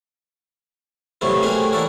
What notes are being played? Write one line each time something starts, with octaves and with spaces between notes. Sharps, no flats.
G2 C3 F#3 A3 B3 E4
A3 A#3 C#4 G4 G#4 B4
D4 E4 F#4 A4 A#4